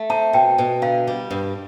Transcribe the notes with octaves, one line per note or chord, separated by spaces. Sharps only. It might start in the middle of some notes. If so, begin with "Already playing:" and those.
Already playing: A3
C4 A5
B2 G5
B2
D3 F5
G3
G2